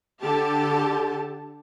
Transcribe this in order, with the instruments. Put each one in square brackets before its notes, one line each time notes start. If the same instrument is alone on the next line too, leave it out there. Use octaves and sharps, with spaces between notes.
[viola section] D3 G4 A4 A5